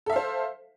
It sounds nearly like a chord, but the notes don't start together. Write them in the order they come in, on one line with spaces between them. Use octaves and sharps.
A4 E5 F5 C5